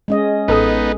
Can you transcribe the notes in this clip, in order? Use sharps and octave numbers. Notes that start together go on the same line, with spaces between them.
G#3 C#4 D#5
A1 B3 D#4 A4 D#6